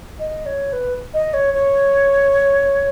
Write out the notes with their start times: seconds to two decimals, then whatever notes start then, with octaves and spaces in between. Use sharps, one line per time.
0.19 D#5
0.46 C#5
0.73 B4
1.14 D#5
1.34 C#5
1.54 C#5